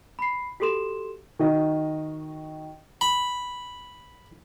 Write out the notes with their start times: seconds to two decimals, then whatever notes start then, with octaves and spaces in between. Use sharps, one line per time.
0.19 B5 C7
0.60 F#4 G4 A4 C6 E7
1.39 D#3 F#4 D#5
3.01 B5